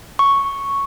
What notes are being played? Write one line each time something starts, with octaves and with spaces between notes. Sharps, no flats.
C#6